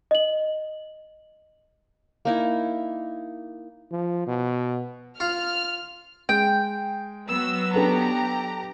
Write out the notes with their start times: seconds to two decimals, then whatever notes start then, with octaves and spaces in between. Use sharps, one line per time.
0.11 D#5 F#7
2.25 A#3 D#4 E4
3.92 F3
4.27 B2
5.20 F4 F6
6.29 G#3 G5
7.28 F#3 B3 E6
7.74 D4 G4 A4 B4 A#5